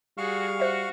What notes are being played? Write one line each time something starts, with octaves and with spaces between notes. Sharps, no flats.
G3 F#4 G#4 F5 C#6 F6
F#4 C5 E5